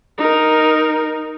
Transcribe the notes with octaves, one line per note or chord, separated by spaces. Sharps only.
D#4 A#4